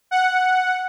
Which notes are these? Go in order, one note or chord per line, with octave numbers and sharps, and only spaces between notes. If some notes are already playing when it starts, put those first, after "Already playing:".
F#5